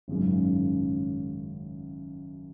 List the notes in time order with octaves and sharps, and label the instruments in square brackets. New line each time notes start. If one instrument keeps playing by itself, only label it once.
[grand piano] G#1 F#2 C#3